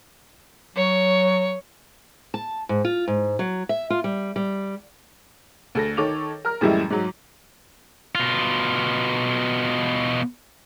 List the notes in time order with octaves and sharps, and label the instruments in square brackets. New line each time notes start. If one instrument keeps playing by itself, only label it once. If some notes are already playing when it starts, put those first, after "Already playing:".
[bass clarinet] F#3 [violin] C#5
[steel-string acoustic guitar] A5
G#2
F4
G#2
F#3
E5
F4
G3
G3
[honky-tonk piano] D2 A4 A#6
D#3 A4 C#5 D6 F7
A#4 F6
F#2 A2 E3 G3 G#3 E4
G#2 F#3
[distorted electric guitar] B2 F4